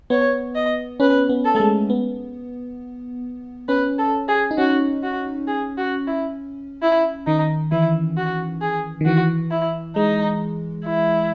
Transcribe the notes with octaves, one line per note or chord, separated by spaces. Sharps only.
B3 C#5
D#5
C#4 B4
B3
A4
A3
G#3
B3
C#4 B4
A4
G#4
D#4
C#4 F#4
F#4
G#4
F#4
E4
E4
D#3 D#4
E3 E4
F#4
G#4
D#3
E3 F#4
E4
G#3 D#4
E4